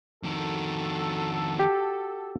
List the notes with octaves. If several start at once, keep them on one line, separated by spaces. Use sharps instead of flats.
F2 D#3 F#4 A4
G4